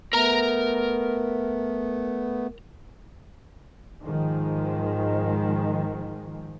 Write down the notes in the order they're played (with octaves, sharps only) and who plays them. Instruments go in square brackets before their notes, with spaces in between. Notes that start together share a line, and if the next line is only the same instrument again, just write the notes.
[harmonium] A3 B3 [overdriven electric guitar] A#4 A#5
[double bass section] G#2 D#3 F3 G#3